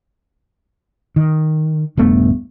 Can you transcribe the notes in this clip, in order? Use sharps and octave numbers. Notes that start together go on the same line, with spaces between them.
D#3
D#1 G2 A3 B3